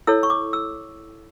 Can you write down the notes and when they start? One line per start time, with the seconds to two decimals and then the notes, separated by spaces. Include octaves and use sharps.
0.07 E4 A4 C#5 E6
0.23 C#6
0.30 D6
0.53 E6